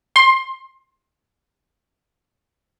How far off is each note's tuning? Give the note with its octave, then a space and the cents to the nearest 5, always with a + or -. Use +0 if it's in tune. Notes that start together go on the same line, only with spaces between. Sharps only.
C6 +20